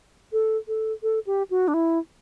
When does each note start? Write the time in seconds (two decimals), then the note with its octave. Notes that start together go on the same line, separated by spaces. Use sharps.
0.33 A4
0.68 A4
1.03 A4
1.27 G4
1.50 F#4
1.68 D4
1.74 E4